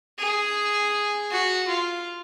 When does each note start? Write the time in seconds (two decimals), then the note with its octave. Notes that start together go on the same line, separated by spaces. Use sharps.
0.20 G#4
1.31 F#4
1.68 F4